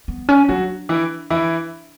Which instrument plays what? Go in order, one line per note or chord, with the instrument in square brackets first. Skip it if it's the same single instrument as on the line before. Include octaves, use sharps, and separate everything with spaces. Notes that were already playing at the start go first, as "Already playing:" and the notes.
[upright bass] B3
C#4
[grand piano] F#3 F#4 [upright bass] D4
[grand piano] E3 E4
E3 E4